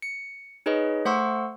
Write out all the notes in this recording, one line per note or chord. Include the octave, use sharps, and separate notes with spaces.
C#7
D#4 G#4 B4 C#5 D#5
A3 C5 F#5 C6 C#6 E6